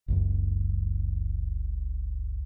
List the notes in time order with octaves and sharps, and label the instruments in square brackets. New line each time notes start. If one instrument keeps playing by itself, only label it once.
[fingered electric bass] F#1 C#2 F#2